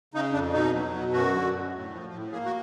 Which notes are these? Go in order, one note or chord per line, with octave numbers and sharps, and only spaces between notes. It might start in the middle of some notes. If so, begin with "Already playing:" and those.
C#3 D#4
F2 D4
B2 D#4
F#3
B2
F#2 F#4
D3
F#2
A2
F3
A2
A#3 G#4
F#4